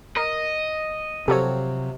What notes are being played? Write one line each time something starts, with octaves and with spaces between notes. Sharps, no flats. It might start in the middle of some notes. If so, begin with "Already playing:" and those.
A#4 D#5
C3 F3 F#3 C4 G4 A4 C#5